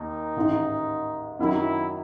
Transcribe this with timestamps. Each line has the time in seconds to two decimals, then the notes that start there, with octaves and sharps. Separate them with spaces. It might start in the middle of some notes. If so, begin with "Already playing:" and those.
Already playing: D#2 D#4
0.36 A1 G#2 D#3
1.39 F#2 D#3 F#3 E4